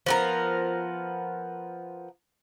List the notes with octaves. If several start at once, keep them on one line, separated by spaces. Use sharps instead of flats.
F3 B3 A#4